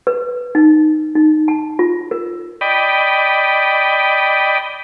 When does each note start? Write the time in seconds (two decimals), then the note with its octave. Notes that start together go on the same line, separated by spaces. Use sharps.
0.07 B4
0.55 D#4
1.15 D#4
1.48 A5
1.79 F4
2.11 A#4
2.61 D5 D#5 G5 B5